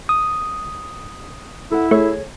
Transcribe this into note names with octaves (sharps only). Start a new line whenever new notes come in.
D#6
E4 A4 F#5
A3 G#4 C#5